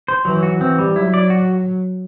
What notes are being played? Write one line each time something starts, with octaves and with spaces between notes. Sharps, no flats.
C5
E3 F#3
F#4
E3 C4
G3
F#3 E4
D5
F#4